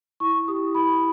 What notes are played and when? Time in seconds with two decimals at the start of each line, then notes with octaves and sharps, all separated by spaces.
0.20 E4 C#6
0.48 G4 D#6
0.75 E4 B5